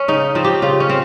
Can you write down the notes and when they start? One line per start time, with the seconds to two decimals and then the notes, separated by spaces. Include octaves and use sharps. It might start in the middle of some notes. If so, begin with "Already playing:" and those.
Already playing: C#4
0.08 C#3 D#4
0.35 F3 C4
0.45 G4
0.62 C#3 F4
0.80 C#4
0.89 C4